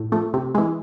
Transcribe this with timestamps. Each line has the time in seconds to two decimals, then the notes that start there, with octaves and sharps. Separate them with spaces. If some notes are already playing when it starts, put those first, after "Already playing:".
Already playing: A2
0.12 F3 A3
0.34 C3
0.55 E3 G#3